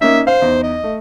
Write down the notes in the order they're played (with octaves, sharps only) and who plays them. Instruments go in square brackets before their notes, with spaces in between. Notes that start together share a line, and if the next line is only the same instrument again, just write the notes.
[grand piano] A#3 C#4 D#4 [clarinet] E5
[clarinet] C5 [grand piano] F5
[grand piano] E2 D#4
[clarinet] D#5
[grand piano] A3